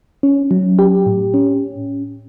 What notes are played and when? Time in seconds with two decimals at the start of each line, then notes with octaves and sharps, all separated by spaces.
0.23 C#4
0.51 F#3
0.79 G4
1.06 A2
1.34 C#4